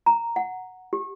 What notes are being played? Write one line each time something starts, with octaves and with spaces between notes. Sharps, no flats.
A#5
F#5
G4